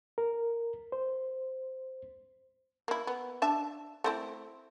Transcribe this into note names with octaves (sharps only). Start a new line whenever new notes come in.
A#4
C5
A#3 E4
B3
D4 E5 A5
A3 C4 E4